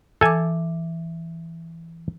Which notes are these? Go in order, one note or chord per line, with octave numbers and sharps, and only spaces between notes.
E3 A4 G#5 D6